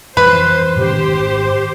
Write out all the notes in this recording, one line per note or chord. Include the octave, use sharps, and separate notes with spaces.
F2 E3 G3 B4 C5
G#2 D#3 C#4 G4 C5